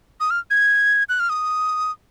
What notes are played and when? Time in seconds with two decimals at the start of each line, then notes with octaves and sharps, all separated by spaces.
0.20 D#6
0.30 F6
0.50 G#6
1.09 F#6
1.20 F6
1.29 D#6